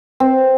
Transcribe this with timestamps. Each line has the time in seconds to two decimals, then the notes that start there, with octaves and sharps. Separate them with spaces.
0.20 C4